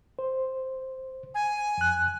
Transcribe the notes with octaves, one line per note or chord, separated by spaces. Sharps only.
C5
G#5
F2 F#6